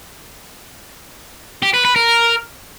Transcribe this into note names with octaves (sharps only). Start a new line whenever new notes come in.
G4
B4
B4
A#4